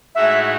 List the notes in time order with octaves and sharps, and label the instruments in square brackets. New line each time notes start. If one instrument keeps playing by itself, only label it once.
[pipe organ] A2 G#3 D#4 F#4 [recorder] E5